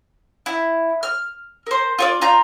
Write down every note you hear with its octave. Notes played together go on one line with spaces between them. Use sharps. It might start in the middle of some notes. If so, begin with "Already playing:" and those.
E4
F6
A#4 C5
F4 C#5 D5
F4 A#5 G6